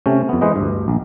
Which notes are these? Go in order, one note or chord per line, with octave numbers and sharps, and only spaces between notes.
C3 A3 C#4
F2 B3
E3 G#3 B4 C5 D#5
D2 G2
A#1